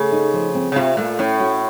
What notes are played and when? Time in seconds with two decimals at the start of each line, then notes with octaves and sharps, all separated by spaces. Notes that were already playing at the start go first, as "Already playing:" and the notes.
Already playing: C#3 A3
0.12 D#4
0.34 F3
0.55 C4
0.72 C#3
0.76 C3 F4
0.97 A#2 A3
1.19 A2 C#4
1.40 F#4